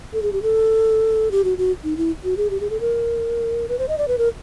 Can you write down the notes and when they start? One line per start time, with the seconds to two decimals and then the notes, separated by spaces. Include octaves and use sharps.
0.13 A4
0.22 G#4
0.32 G4
0.42 A4
1.31 G4
1.44 F#4
1.58 F#4
1.84 D#4
1.97 E4
2.24 F#4
2.37 G#4
2.50 G4
2.60 G#4
2.70 A4
2.80 A#4
3.69 B4
3.79 C5
3.88 D#5
3.98 D5
4.08 B4
4.18 A#4